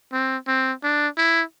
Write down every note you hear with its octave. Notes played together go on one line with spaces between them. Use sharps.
C4
C4
D4
E4